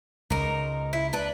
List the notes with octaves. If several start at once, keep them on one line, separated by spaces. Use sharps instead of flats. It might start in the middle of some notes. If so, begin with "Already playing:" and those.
C#2 D#4 A#4
E4
D4 B4